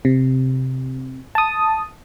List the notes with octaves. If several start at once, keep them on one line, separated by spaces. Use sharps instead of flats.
C3
A5 D#6